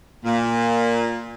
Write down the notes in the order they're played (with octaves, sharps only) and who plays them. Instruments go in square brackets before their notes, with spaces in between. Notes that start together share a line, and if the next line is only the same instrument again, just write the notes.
[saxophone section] A#2